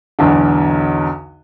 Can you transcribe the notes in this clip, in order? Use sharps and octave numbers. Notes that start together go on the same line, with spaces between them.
B1 E2 D3